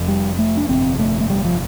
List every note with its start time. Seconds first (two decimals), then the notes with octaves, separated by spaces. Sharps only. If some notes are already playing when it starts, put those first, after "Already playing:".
Already playing: F1 F2
0.08 G3
0.39 A3
0.57 D4
0.69 G1 F2 C3 C4
0.99 A3
1.20 A3
1.30 G3
1.45 F3